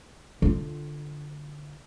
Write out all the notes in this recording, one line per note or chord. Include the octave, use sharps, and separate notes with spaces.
D3 F4